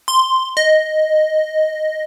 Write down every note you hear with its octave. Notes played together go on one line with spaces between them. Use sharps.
C6
D#5